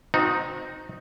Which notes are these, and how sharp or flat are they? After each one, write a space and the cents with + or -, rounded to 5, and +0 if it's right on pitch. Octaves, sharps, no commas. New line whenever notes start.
C4 +0 D#4 +0 F#4 -35